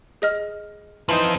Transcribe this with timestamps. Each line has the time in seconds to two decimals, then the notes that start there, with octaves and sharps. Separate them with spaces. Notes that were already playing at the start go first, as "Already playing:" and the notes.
0.22 G#4 D#5 F6
1.09 E3 F3 C4 D#4